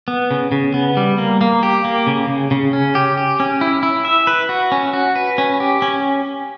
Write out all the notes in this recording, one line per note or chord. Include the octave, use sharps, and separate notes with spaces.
B3
C#3
C#3
B3
G3
A#3
A#3
G4
A#3
C#3
C#3
C#3
C#4
G4
G4
C#4
E4
E4
E5
B4
F#4
C#4
F#4
B4
C#4
G4
C#4